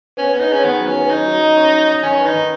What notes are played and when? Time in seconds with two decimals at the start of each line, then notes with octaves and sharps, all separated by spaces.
0.17 B3 C#4
0.33 B3 C#4
0.40 D#4
0.48 C#4 G#4
0.64 D#3 B3
0.79 F#3
0.86 C#4
0.95 B3
1.10 C#4 D#4
1.25 F#3
1.41 D#5
1.57 C#4
1.72 D#5
1.87 D#5
2.03 D#3 C#4
2.19 B4
2.26 D#4
2.34 D#3